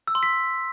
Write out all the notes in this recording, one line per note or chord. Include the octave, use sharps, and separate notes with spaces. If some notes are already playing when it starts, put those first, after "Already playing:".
E6
C6
B6